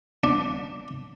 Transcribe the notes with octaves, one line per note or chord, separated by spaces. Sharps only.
D4